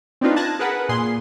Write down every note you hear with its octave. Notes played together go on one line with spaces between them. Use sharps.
C4 D4 D#4 F4 B4
A5 F#6 G#6 A#6
G#4 A#4 B4 F#5
A#2 G#4 C6